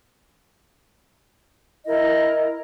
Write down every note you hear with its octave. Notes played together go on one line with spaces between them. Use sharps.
E4 A#4 D#5